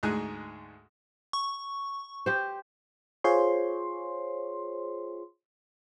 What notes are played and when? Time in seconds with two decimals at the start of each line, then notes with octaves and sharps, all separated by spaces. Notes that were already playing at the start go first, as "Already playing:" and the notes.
0.03 D2 G#2 G#3 G#4 G#5 F#6
1.33 C#6
2.26 G4 C5
3.24 F4 G#4 C5 C#5 C6